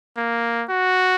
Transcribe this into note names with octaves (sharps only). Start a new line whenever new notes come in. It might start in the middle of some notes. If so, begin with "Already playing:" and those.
A#3
F#4